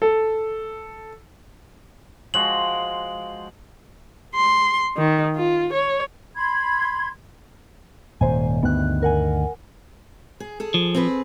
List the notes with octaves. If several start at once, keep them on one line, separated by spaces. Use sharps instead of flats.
A4
F3 G#3 F#4 F#7
C6
D#3
F4
C#5
B5 C6 G#6
D#1 G#2 C5 G#5
D2 G2 D#3 B3 F#6
A#4 F#5 G#5
G#4
G#4 A4
F3
C4 G#4 B4